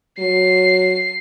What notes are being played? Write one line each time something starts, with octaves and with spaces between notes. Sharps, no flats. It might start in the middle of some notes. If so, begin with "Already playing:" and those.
F#3 C7